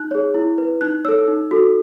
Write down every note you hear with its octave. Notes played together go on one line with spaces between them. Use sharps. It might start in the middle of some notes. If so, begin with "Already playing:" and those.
Already playing: D#4 F#6
G#4 C#5
E4
B4
D#4 F#6
A4 C#5 E6
D#4
F#4 A4